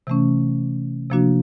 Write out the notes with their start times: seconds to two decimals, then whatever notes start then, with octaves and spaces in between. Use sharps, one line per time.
0.07 C3 E3 A3 C#4
1.10 C3 F3 A#3 D4 F#4